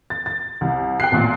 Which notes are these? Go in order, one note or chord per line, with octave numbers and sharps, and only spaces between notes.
A6
A6
C2
G5 F#6 C7
A1 A#2